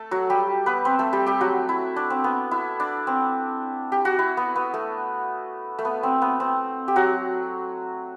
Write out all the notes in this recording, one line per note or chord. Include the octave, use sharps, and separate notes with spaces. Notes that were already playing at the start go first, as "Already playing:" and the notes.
Already playing: A3 A4
F#3 F#4
G3 G4
B3 B4
C4 C5
A3 A4
G3 G4
G3 G4
F#3 F#4
E4
D4
C4
B3
E4
D4
C4
G4
F#4
E4
B3
B3
A3
A3
B3
C4
B3
C4
G4
F#3 F#4